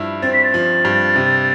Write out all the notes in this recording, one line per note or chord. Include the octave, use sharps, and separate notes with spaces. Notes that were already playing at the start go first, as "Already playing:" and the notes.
Already playing: G2 F3 E4
C4 A6
B6
A6
F3
G2
C3